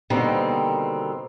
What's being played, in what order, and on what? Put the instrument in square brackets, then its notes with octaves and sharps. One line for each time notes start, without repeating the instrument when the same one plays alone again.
[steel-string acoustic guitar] B2 D3 D#3 G3 A#3 C4